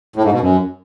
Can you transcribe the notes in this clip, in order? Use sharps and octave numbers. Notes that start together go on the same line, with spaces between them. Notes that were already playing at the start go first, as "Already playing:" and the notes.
A2
G#2
B2
F#2